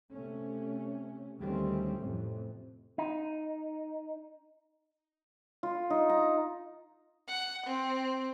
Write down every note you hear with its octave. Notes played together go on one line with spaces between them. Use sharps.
C3 A3 C#4
D2 D#3 G3 A3 C4 C#4
F2 A2 C3
D#4
F4
D#4
A#5
F#5
C4